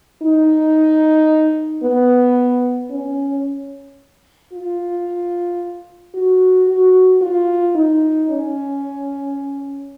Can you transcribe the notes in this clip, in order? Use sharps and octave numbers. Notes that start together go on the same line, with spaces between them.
D#4
B3
C#4
F4
F#4
F#4
F4
D#4
C#4